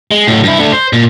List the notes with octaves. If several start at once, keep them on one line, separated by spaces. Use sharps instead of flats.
G#3
A2 F#3
G2 E4
A3 D4
C5
A#2